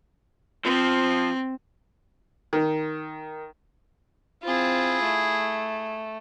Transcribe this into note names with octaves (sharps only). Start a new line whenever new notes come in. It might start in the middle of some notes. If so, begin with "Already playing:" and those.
F3 C4
D#3
C4 E4 F4 G#4
A3